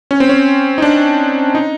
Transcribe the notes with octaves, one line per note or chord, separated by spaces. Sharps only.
C#4
C4
C#4
D#4
D4
D#4